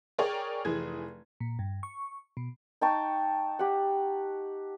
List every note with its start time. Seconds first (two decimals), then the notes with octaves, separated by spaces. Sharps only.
0.18 G#4 A#4 C#5 D5 G5
0.65 F1 E3 G#4 G#6
1.40 A#2
1.59 G2
1.83 C#6
2.37 B2
2.81 D#4 G5 A5 C#6
3.59 G4 F#5